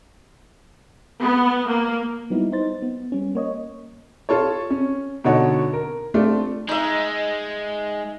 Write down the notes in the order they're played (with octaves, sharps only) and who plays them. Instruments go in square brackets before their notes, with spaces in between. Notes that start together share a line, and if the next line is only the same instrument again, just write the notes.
[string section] B3
A#3
[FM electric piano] F#3 G3 B3 D#4 E4
D#4 C5 A6
B3
G3 C#4
A#3 C#5 D#5
[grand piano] F4 A4 C#5
C#4
B2 D3 D#4 A4 C#5 F#5
A#4
A3 C4 D4 F4
[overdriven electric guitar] G#3 [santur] D#4 E5